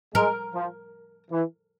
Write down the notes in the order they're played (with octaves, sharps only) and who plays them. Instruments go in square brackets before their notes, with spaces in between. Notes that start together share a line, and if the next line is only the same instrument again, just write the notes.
[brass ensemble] G#3 [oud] A#4
[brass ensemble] F3
E3